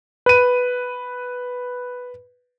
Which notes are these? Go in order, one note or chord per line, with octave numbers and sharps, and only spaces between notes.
B4 D#7